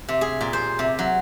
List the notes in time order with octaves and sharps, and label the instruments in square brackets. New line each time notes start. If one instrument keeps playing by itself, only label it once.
[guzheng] C3
G#4
A#2
C5
C3
F#3